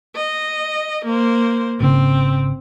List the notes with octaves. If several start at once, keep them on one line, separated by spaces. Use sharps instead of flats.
D#5
A#3 C5
G#1 C#3 C4